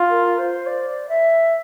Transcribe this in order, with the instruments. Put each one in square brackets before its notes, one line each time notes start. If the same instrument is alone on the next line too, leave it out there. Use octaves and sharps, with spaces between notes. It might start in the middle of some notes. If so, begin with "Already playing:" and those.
Already playing: [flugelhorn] F4
[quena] A#4
C5
D5
E5